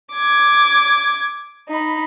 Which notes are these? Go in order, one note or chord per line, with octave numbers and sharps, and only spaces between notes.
D6 G#6
D#4 B5